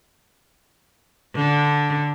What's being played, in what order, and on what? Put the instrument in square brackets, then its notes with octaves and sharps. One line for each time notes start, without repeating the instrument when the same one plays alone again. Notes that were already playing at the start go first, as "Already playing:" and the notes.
[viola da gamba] D3